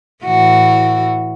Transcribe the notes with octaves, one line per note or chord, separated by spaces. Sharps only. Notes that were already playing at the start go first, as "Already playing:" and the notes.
A2 E3 F#4